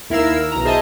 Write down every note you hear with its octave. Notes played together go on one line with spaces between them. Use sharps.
D#2 E4 A#4 F5 E6
B1 A#5
G#4 C5 D#5 E5 G#5 A5